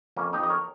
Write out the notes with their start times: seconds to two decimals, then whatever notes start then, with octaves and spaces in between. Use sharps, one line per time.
0.16 F2 A#3 C#4
0.33 D#4 G4
0.39 F2 D#5
0.50 A#4 C#5